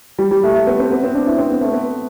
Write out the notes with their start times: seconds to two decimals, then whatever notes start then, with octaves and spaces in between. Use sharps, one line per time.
0.19 G3
0.31 G3
0.44 A3
0.55 A3
0.67 B3
0.80 C4
0.91 B3
1.03 C4
1.14 D4
1.27 E4
1.38 C4
1.50 B3
1.61 A3
1.72 B3